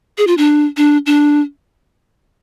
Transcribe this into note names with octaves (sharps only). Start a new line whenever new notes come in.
G#4
F4
D4
D4
D4